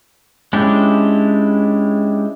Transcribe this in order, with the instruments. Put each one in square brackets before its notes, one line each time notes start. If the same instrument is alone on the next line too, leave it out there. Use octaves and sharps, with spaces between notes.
[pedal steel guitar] G#3 C#4 D4 E4 G4